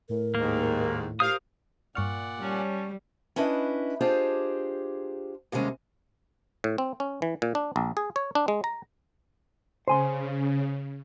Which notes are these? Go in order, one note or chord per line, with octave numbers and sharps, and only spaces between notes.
A2 A#4
D#2 G#2 A#3
G4 A#4 C5 F5 D#6
G2 A#2 D5 F#5 C#6 F6
G3 C#4 C#5 A5
C#4 D4 E4 B4 D#5
D4 F4 G4 G#4 C5 D#5
D#2 C3 G3 G#3 C#4
A2
C4
C#4
E3
A#2
D4
A#1
G#4
C#5
D4
G#3
A#5
C#3 C5 G#5 C6